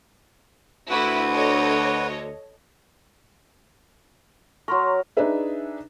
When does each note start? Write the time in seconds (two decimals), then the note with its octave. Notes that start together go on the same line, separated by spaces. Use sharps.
0.90 D2 E4 F#4 B4
1.32 A4 C#5 D#5
4.68 F#3 A#4 C6 C#6
5.17 D4 D#4 G#4 B4 E5